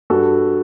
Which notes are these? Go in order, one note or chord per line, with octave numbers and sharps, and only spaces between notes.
G2 F#4 A4